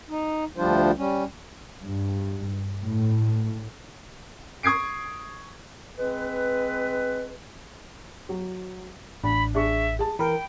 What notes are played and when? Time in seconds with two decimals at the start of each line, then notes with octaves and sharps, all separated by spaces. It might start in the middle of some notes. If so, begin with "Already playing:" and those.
0.10 D#4
0.57 D2 F3 G3 D4 F4 C5
0.98 G3 C#4
1.82 G2
2.80 A2
4.63 C#6 D#6 G#6 C7 D7
5.98 G#3 C4 B4
8.29 F#3
9.24 A1 D4 B5
9.54 D4 G#4 E5 C#6
9.99 G#4 A5
10.19 E3 A#4 G5 B5